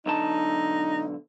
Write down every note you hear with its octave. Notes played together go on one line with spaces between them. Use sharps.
B1 D3 D#4 A5